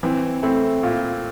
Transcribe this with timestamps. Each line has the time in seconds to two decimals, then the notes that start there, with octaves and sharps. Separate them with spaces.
0.03 E3 C4
0.43 A3 C4 E4
0.83 A#2